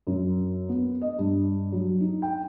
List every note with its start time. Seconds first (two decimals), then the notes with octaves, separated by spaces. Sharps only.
0.07 F#2
0.69 B3
1.01 D#5
1.19 G2
1.72 F#3
2.00 D#4
2.22 G5